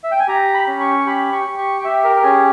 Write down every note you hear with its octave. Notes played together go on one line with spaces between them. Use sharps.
E5
G5
G#5
G4 A#5
B5
C#4
C#6
G4 B5
C#6
G4
C#6
G5
G4 E5
A#4
A#4
C#4 G#4